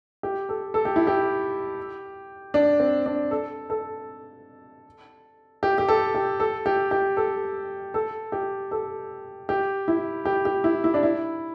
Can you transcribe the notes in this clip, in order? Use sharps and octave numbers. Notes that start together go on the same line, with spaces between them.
G4
A4
A4
G4
E4
G4
D4
C4
D4
A4
A4
G4
G4
A4
G4
A4
G4
G4
A4
A4
G4
A4
G4
E4
G4
G4
E4
E4
D4
E4